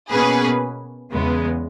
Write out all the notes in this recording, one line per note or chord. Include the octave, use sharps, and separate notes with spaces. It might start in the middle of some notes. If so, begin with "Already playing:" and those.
B2 A#3 C#4 G#4 B4
E2 C#3 G#3 B3